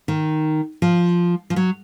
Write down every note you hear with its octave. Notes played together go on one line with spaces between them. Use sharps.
D#3
F3
F3
F#3